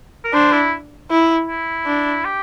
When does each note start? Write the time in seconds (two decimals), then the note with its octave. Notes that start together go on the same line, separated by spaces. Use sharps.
0.25 A#4
0.33 D4 C5
0.53 E4
1.10 E4
1.48 E4
1.86 D4
2.25 G4